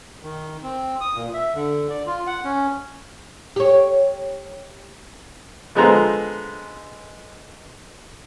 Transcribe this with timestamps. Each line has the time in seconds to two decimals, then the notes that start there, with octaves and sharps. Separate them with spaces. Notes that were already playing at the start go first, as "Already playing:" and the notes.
0.23 D#3
0.63 C4
1.01 D#6
1.15 A#2
1.34 E5
1.55 D3
1.90 D5
2.06 F4
2.27 F#5
2.44 C#4
3.56 G4 C#5
5.75 D3 F3 G#3 B3 C5 A#5